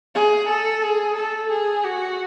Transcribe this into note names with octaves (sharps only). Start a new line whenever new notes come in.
G#4
A4
G#4
A4
G#4
F#4